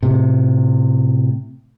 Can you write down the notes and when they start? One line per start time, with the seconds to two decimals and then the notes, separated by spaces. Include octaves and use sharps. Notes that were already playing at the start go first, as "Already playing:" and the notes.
0.03 A2 C3